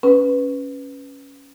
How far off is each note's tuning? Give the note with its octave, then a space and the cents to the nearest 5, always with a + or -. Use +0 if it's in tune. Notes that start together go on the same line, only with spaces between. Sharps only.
C#4 +0 B4 +0